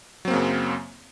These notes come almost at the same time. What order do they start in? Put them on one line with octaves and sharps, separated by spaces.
F#3 C4 A#3 C#3 F#2